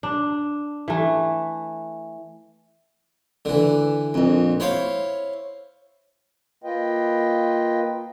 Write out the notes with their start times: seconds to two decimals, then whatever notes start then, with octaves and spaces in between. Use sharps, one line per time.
0.03 D4
0.88 E3 A3
3.45 D3 E3
4.14 A#1 F2
4.60 E4 C5 C#5 F5
6.64 A#3 F4 B4 D#5 G5